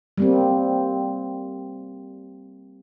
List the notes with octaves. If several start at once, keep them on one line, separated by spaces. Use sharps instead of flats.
G3 A#3 C4